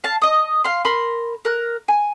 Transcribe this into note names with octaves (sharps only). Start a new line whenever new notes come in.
F5 A5
D#5 D#6
F5 C6
A#4 B5 C6
A#4 F#6
G#5